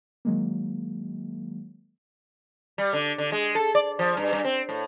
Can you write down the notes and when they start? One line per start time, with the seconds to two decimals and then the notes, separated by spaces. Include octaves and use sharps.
0.25 D#3 F#3 G#3 A#3
2.78 G3
2.93 D3
3.18 D3
3.32 G#3
3.55 A4
3.75 D5
3.99 F3
4.17 G2
4.32 G2
4.45 C4
4.69 A2